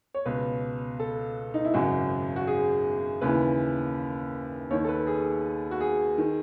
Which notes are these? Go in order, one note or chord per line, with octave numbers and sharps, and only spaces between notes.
C#5
C#2 B2 B4
A4
D#4
E4
G#1 F#2 C#3 F#4
F#4
G#4
D#2 C#3 E3 B4
D#2 D#3 C#5
A4
B4
G#4
F#4
G#4
D#3